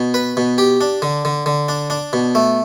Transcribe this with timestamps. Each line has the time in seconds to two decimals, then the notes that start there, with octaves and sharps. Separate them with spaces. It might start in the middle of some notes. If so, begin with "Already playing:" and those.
Already playing: B2
0.14 B4
0.37 B2
0.58 G4
0.81 D4
1.02 D3
1.25 D3
1.46 D3
1.69 D4
1.90 D4
2.13 B2
2.35 A3